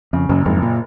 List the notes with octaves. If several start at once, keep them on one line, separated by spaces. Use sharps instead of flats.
F2 C#3
F#1 F#2
F#1 F2 G#2
A#2